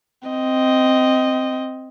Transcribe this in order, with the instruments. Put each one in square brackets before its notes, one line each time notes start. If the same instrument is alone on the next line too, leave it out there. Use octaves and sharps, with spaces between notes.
[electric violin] C4 D#5